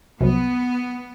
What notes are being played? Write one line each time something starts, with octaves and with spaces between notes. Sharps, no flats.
C2 F#2 C3 B3